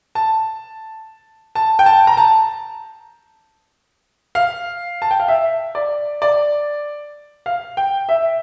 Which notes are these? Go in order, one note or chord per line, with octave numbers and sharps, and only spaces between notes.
A5
A5
G5
A5
A#5
A5
F5
A5
G5
F5
E5
D5
D5
F5
G5
E5